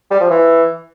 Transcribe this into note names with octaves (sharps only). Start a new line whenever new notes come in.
G3
F3
E3